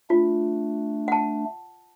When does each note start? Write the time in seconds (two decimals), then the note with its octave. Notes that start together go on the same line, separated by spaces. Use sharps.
0.10 A3 D4 F4
1.08 F#5 A5